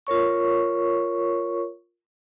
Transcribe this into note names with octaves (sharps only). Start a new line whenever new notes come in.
F4 A#4 C#5 C#6